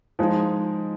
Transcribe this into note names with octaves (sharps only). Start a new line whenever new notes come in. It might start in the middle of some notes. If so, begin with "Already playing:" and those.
F3 G#3 D#4